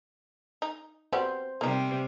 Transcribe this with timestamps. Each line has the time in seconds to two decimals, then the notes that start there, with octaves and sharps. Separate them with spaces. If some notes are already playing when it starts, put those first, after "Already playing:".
0.62 D#4
1.13 F#3 G3 B3 C5
1.61 C3 G3 A#3 D#4